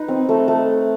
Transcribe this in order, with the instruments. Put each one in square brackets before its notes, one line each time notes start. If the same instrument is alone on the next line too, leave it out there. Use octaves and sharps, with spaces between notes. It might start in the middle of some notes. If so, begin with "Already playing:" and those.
Already playing: [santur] D#4 B4
C4
A3
A3